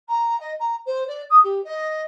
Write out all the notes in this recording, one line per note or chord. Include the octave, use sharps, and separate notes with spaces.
A#5
D#5
A#5
C5
D5
D#6
G4
D#5